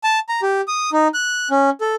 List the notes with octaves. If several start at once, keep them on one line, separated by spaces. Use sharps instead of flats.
A5
A#5
G4
D#6
D#4
F#6
C#4
A4